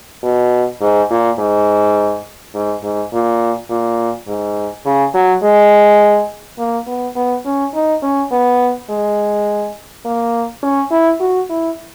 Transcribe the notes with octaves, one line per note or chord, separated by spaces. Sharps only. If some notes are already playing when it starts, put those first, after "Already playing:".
B2
G#2
A#2
G#2
G#2
G#2
A#2
A#2
G#2
C#3
F#3
G#3
A#3
B3
B3
C#4
D#4
C#4
B3
G#3
A#3
C#4
E4
F#4
E4